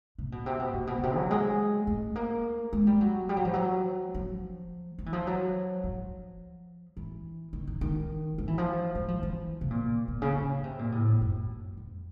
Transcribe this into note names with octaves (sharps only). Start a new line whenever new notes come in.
C3
B2
C3
B2
A#2
B2
B2
C3
F#3
G#3
A3
A#3
G#3
G3
F#3
G3
F#3
F3
F#3
F3
F#3
E3
F3
F#3
F3
E3
D#3
D#3
D#3
F3
E3
F3
F#3
F3
E3
C3
A#2
B2
C#3
C#3
C3
A#2
A2
F2
F#2
F2